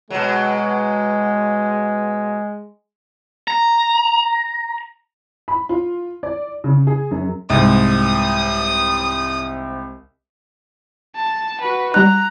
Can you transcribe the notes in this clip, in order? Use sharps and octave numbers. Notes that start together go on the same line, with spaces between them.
B2 F#3 G#3
A#5
B5
F4
D5
C#3
G#4
F#2
C2 G#2 D#6
A5
F#4 B4
G3 D#4 A#5 F#6